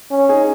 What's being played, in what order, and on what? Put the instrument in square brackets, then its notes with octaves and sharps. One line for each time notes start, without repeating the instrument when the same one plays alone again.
[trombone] C#4
[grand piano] D#4 G#4